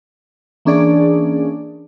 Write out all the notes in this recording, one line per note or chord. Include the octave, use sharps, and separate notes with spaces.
E3 A#3 C#4 D4 G#4 D5